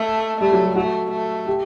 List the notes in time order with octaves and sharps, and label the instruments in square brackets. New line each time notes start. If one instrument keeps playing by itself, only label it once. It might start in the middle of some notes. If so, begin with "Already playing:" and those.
Already playing: [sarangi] A3
[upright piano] G3 [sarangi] A3
[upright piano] F#3
G3
[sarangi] A3 [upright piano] F#4
[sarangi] A3
[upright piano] G4